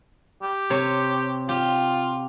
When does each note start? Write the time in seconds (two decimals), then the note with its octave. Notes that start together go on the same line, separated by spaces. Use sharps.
0.42 G4
0.70 C3 C#5
1.49 F4 G4